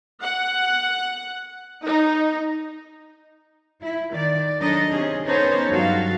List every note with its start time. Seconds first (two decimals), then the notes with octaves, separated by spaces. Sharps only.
0.23 F#5
1.86 D#4
3.82 E4
4.12 D#3 D5
4.59 F#3 D4 D#4 A4 D#5
4.91 C3 C#4 G#4
5.25 B3 C#4 D#4 A4 C5 C#5
5.69 G2 F#3 F#4 A4 F5